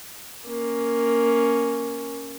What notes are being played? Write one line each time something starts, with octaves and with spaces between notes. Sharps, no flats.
A#3 C#4